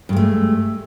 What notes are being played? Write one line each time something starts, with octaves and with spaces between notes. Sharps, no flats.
G2 G#3 A3